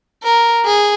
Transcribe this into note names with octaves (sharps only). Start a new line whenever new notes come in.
A#4
G#4